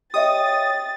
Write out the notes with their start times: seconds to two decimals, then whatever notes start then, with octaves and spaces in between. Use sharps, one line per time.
0.14 G4 C#5 D#5 E5 G5 D#6 A6